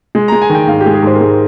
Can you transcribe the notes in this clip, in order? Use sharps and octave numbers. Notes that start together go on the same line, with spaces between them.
G#3
G#3 A#5
G#5
D#3
G5
G#2 F5
G4
G#3
G#4
G#2 C5
A#4
G#3 G#4
A#4